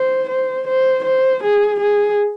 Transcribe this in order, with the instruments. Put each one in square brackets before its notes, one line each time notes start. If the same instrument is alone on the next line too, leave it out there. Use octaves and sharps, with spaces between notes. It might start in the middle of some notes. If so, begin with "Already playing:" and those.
Already playing: [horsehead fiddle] C5
C5
C5
C5
G#4
G#4